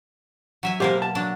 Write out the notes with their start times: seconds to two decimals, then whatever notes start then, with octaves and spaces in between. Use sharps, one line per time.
0.63 F#3 E5 G#5
0.80 B2 A#3 G4 A#4 C5
1.02 A5
1.15 F#3 D4